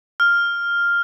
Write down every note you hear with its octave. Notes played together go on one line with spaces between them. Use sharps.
F6